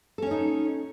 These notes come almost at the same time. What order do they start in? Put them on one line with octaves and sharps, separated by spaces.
A4 C#4 C#5 D#4